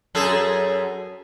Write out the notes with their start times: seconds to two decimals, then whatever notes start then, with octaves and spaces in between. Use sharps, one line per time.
0.15 F#2 G#4 A4